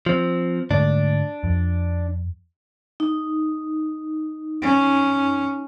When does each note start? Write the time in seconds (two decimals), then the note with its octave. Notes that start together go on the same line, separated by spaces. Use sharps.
0.06 F3 C4
0.71 G#2 D3 A3 D4
1.44 F2
3.00 D#4
4.62 C#4